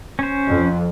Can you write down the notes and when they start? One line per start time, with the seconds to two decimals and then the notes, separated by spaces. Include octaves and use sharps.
0.19 C#4 C5
0.49 F2